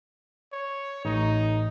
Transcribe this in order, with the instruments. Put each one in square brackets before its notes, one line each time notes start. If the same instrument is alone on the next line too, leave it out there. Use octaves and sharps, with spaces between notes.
[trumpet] C#5
[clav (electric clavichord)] A1 [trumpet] D#4